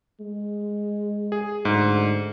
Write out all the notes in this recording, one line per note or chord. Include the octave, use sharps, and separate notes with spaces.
G#3
G#4
D2 G#2